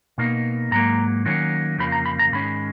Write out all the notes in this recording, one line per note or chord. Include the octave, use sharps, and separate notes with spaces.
B2 A#3 D#4
G#2 F#3 A#3 A#5
D#3 F#3 A#3 C#4
F2 C#3 F3 A#3 B5
A#5
B5
A#5
G#2 D#3 G#3 C#4 B5